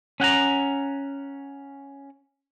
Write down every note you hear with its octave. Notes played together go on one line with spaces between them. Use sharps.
C#4 F#5 G5 A#5